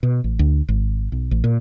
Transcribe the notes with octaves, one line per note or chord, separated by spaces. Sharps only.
B2
A1
D2
G#1
B1
A1
A#2